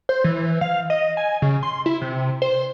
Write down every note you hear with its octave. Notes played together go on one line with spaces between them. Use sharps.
C5
E3
F5
D#5
G#5
C#3
C6
E4
C3
C5